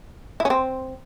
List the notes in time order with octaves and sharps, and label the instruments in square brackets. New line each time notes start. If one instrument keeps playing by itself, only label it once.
[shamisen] E4
C#4
C4